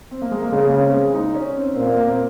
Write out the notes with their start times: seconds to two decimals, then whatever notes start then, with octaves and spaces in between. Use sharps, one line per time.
0.11 C4
0.22 A#3
0.32 G#3
0.42 A#3
0.52 C#3 G#3
0.66 A#3
0.80 C4
0.94 G#3
1.14 D#4
1.35 C#4
1.56 C4
1.75 A#2 C4
1.86 A#3
1.97 A#3
2.07 C4